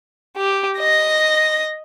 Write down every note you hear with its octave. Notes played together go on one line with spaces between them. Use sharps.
G4
D#5 A#6